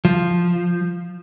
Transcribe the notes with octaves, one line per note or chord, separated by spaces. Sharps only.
F3